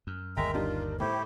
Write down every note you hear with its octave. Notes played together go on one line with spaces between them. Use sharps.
F#2
G1 D#2 G#3 A#4 E5 G5 A#5
G3 D4 D#4 F4
A2 E4 G4 C5